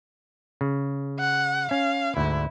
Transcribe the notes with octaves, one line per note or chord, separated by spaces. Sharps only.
C#3
F#5
C#4 F5
D2 G#2 D3 E4